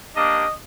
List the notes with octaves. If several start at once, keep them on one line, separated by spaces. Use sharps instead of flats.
A#3 D4 G4 D#5